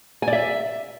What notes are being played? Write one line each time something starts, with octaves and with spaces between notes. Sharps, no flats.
G#5
D5
E5